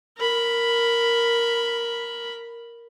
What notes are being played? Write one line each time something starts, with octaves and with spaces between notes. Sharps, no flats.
A#4 B5